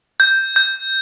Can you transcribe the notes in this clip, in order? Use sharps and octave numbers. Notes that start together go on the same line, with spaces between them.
G6
G6